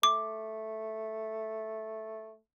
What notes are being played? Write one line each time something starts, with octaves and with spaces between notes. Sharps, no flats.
A3 D6